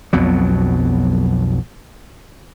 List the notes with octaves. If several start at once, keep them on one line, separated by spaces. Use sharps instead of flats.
B1 F2 B2 F#3